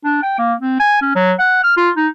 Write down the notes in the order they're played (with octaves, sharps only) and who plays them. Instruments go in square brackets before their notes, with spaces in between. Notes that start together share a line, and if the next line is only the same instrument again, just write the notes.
[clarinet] D4
G5
A#3
C4
G#5
C#4
F#3
F#5
F6
F4
D#4